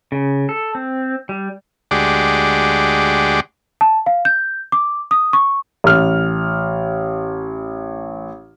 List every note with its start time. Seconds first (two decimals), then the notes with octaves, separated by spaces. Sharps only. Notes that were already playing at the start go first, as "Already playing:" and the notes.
0.12 C#3
0.49 A4
0.75 C4
1.29 G3
1.91 D2 G#3 F#4 G4 D5
3.81 A5
4.06 F5
4.25 G6
4.72 D6
5.11 D#6
5.33 C#6
5.84 A1 F6